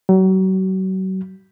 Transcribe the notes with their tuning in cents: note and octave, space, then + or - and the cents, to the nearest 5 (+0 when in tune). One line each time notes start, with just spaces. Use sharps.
F#3 +35